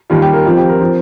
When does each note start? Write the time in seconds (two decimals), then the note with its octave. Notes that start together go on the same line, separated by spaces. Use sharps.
0.10 D#2 D#3 G3 F4
0.22 G4
0.33 A#4
0.45 F2 F3 C4 F4
0.57 G4
0.69 A#4
0.81 F3 C4